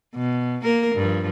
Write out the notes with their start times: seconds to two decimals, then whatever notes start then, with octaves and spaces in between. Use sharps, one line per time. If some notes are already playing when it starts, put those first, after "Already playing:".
0.15 B2
0.63 A#3 A#4
0.95 G2 F3